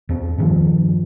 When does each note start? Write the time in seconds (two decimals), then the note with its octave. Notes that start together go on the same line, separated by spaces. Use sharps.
0.09 E2 C4
0.38 G2 D#3 F3